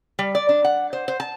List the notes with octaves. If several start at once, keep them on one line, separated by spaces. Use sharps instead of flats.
G3
D5
D4
F#5
C5
C5
A5